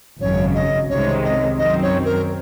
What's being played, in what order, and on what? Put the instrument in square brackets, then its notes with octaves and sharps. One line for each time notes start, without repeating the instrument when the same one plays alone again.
[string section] G#1 F#2 C#3 [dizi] C#5
[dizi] D#5
[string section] C2 C3 D#3 G#3 [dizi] C#5
[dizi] D#5
[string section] F#2 D#3 F#3 C4 [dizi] D#5
[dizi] C#5
A#4